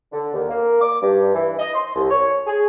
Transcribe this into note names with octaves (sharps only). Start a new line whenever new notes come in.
D3
D#2
A#3
D6
G2
E3
D#5
C6
C2
C#5
G#4